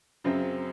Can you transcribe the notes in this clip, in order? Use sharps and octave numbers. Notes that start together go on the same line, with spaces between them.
F#2 C#3 F#3 C4